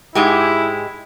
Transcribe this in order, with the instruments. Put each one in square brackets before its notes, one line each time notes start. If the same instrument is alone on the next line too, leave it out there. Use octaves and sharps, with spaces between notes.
[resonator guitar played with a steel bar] G#2 G#3 G4 [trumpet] E4